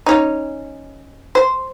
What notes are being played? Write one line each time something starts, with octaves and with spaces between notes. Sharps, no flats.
C#4 D#4
C5